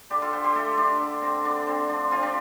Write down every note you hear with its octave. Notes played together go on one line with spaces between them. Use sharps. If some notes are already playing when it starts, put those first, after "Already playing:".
D3 D4 G4
F4 A4
D3 G4 C5
G4 C5
A3 F4 A4
A3 D4 G4
D3
D3 C4
D3 D4
D3 C4
F3 D4
F3 C4 F4
D4 G4